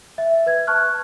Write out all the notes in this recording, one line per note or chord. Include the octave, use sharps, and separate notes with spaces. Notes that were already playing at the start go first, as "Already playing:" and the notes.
E5
B4 G#6
A5 C#6 F6 F#6